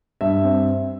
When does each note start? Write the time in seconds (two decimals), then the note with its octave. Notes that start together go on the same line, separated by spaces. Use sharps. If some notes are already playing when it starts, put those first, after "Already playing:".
0.21 G2 E5
0.44 C4